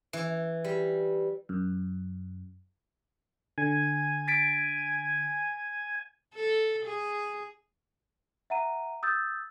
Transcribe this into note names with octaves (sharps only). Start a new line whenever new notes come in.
E3
G3
F#2
D3 G#5
A6 B6 D7
A4
G#4
E5 F#5 A#5 D#7
D#6 E6 G6 A6